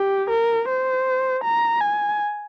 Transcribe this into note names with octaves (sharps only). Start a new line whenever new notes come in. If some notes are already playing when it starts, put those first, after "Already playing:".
Already playing: G4
A#4
C5
A#5
G#5